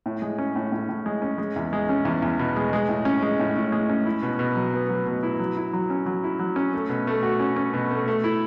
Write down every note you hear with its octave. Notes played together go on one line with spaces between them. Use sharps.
A2
G#3
C#4
A2
A2
A2
G#3
C#4
G#3
E2
G#3
C#4
E2
E2
B2
G#3
G#3
A2
C#4
G#3
A2
A2
G#3
C#4
E4
B2
B2
F#3
B3
F#3
B2
E4
F#3
E4
F#3
C#4
F#3
E4
F#3
C#4
A3
B2
A3
F#4
C#4
C#4
B2
A3
A3
E4